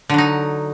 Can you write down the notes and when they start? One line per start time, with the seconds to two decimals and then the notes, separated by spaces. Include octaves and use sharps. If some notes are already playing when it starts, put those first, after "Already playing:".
0.09 D3
0.14 F#3
0.18 D#4